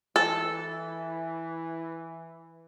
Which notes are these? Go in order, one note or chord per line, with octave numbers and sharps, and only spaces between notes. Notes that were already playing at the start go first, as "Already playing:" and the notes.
E3 A4